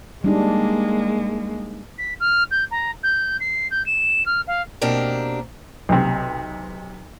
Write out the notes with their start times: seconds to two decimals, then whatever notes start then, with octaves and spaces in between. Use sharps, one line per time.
0.24 G3 G#3 A#3 D4 D#4
1.98 B6
2.20 F6
2.51 G6
2.71 A#5
3.03 G6
3.40 C7
3.71 G6
3.86 E7
4.26 F6
4.47 F5
4.81 B2 A#3 C4 D4 G4 A#4
5.89 B1 C3